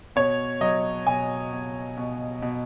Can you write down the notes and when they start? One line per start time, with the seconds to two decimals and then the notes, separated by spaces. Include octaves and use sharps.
0.16 B2 C#5
0.61 F#3 D#5
1.07 B2 G#5
1.53 B2
1.97 B2
2.42 B2